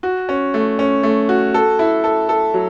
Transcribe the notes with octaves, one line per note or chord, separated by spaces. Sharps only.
F#4
C#4
A3
C#4
A3
F#4
A4
E4
A4
A4
F#3